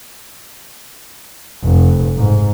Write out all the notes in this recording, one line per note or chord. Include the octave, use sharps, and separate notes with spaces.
F1
G#2